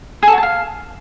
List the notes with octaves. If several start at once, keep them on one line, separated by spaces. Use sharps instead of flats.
G#4
A4
F#4
A5
F5